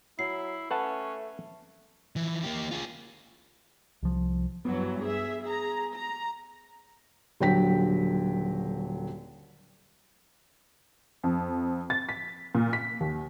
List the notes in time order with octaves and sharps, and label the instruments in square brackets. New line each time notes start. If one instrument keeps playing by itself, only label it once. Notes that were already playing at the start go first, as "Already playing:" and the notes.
[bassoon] F#3 [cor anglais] E4 [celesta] C7
[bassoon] A3 [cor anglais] C#4 [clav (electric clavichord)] B4 F#5 A5
[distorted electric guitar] E3 F3
A#3 G4
F4 G#4
[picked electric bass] C2 F3
[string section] G2 E3 F#3 [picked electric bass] B3
[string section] G#4 E5
G#4 A#5
A#5
[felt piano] D#1 D3 F#3 G5 B6
[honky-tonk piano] F2
A6
B6
A#2
B6
D#2